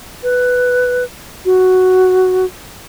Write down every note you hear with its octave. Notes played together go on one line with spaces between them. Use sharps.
B4
F#4